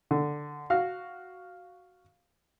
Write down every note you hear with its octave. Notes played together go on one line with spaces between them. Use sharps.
D3
F#4 F5